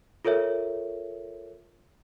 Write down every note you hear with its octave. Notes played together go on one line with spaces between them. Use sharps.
F4 A4 A#4 C#5 E5